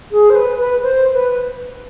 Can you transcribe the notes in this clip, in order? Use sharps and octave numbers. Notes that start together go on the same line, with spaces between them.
G#4
C5
B4
B4
C5
B4